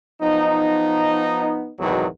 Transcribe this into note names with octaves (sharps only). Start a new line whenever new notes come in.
F3 B3 D#4
G#1 E2 B2 D#3 F#3